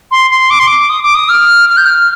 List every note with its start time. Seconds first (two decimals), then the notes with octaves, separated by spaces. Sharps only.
0.11 C6
0.30 C6
0.50 D6
0.59 C6
0.67 D6
0.90 D#6
1.03 D6
1.15 D#6
1.29 F6
1.70 F6
1.77 G6
1.86 F6